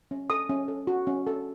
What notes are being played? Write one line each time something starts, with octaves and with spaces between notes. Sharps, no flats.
C#4
A4 D#6
C#4
A4
F#4
C#4
A4